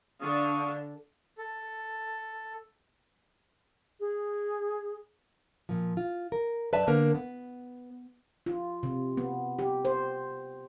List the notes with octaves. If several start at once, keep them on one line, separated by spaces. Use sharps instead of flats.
D3 D4 F5 C#6 D#6
A4
G#4
A#2 F3
F4
A#4
F#2 B4 D5 E5 A5
D3 A#3 B3 A#4 B4
B3
F4
C3
B3
G4
C5